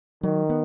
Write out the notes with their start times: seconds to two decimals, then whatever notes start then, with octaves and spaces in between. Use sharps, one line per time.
0.23 D#3 F#3
0.50 B3